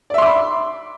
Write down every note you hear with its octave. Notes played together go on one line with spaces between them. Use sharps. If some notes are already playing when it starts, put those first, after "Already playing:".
D5 E5 B5 C6 D6